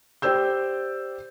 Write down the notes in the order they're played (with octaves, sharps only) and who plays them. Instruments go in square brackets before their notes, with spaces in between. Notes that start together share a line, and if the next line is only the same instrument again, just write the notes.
[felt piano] G4 C5 D5 E6 G6